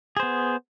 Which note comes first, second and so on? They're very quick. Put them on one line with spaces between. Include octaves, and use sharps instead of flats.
G#4 C5 B3